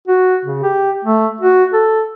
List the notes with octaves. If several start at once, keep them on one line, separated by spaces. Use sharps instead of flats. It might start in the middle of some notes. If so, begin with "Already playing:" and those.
F#4
C#3
G4
A3
F#4
A4